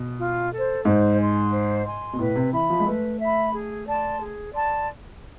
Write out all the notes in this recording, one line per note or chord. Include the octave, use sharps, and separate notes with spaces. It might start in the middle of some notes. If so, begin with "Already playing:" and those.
Already playing: B2
F4
A4 C5
G#2 C5
G#5 C6
C5
G#5 C6
B2
A2 B4
C3
E3 E5 B5
F3
G#3
A3 B4
E5 B5
G#4
D5 A5 C6
G#4
D5 A5 C6